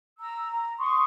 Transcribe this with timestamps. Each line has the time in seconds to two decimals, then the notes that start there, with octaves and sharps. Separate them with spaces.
0.20 A#5 E6
0.51 A#5
0.79 C6 C#6 D#6